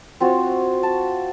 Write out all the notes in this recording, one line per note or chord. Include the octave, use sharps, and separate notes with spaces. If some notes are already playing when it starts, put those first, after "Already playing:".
C4 F4 F#4 C#5
A5